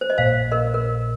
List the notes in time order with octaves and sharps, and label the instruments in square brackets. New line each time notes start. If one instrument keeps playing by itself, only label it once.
[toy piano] C5
D#5
[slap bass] A#1 A#2 A#3 [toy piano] C5 F5
[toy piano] A#4 D#5
A#4